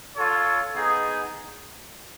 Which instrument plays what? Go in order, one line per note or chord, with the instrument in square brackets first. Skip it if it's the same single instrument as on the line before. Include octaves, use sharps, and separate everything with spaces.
[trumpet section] F4 A4 C#5
B3 D#4 G#4